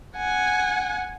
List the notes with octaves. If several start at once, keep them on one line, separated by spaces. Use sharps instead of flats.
F#5 G#5